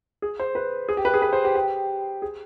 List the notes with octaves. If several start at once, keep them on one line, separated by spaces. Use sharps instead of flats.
G#4
C5
B4
G#4
G4
B4
G#4
B4
C5
G4
G4
G#4